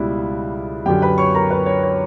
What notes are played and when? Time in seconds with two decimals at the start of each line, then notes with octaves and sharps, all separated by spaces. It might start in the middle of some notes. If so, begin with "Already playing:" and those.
Already playing: C#2 B2 G3 E4
0.86 F#2 D3 F#3 G4 G5
1.02 B4 B5
1.18 C#5 C#6
1.35 A#4 A#5
1.50 B4
1.66 C#5
1.83 C#5